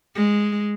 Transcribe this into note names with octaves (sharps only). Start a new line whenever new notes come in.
G#3